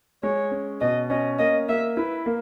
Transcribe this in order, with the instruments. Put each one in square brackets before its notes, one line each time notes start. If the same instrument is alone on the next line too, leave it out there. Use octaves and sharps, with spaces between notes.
[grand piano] G#3 [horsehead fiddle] C#5
[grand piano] C#4
[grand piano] B2 [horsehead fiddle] D#5
[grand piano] C#4 [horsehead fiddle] D#5
[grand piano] A#3 [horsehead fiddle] D#5
[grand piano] A#3 [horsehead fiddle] E5
[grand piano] E4 [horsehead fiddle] B4
[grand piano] A#3